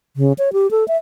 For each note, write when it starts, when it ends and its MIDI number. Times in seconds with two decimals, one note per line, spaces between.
0.16 0.33 49
0.38 0.52 73
0.53 0.70 67
0.71 0.86 69
0.88 0.97 76